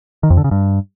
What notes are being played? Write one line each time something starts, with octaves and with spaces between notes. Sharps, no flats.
D#3
F2
D3
C#3
G2